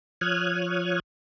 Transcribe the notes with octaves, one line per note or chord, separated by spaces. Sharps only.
F3 C#5 D#6 F6 F#6 G#6